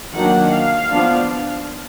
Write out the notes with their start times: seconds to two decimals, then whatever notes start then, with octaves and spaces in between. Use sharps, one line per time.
0.14 D#3 F#3 A#3 D4 F#5
0.52 F5
0.90 F3 B3 D4